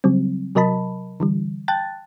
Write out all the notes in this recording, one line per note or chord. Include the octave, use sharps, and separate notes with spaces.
C#3 F#3 G3 C4
C3 F#3 A#4 D#5 A5 B5
D3 E3 G3
G5 A5 F#6 A6